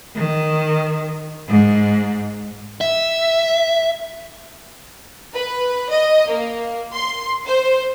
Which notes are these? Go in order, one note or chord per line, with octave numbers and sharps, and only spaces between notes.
D#3
G#2
E5
B4
D#5
A#3
C6
C5